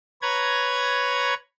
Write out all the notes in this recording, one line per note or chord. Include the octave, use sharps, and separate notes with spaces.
B4 C#5 A#5 G#6